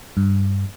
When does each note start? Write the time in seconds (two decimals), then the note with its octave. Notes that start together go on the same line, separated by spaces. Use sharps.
0.17 G2